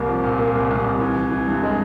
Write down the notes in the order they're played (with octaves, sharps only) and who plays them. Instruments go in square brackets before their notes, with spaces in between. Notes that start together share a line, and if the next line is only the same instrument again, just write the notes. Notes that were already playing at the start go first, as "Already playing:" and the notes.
Already playing: [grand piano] C2 A#3
F3
A#2
A#3
C2
C2
C2
E3
E3
E3
G2
G#3